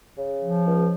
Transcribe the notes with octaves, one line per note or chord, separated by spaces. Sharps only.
C#3
F3
C#2